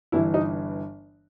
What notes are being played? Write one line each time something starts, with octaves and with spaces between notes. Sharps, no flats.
G1 G2 E3 E4
D#4